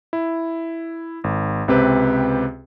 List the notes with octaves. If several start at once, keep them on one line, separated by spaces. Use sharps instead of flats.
E4
G#1
C#2 C3 C4 G4 B4